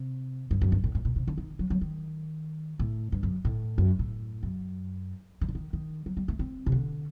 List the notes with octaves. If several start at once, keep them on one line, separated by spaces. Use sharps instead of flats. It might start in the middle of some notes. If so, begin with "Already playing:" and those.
Already playing: C3
G2
F#2
G2
A2
A2
A#2
C3
D3
D#3
F#3
F#3
D#3
A2
G2
F#2
A2
F#2
A2
F#2
D#3
D3
D#3
D#3
F#3
G3
A3
C4
C3
D3